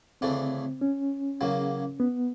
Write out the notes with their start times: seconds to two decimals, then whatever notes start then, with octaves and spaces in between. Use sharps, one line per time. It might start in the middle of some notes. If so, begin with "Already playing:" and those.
0.21 D2 C#3 E3 A3 C4 D4
0.81 C#4
1.41 E2 C#3 F#3 A#3
2.00 B3